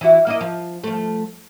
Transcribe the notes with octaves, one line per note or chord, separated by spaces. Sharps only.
E3 E4 F#4
A#3 E4 D#5
F3
F3 A3